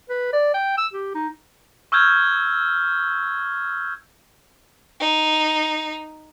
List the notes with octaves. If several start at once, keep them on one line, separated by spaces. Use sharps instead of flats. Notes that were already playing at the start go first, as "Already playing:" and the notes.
B4
D5
G5
E6
G4
D#4
C#6 E6 F6 G6 G#6
D#4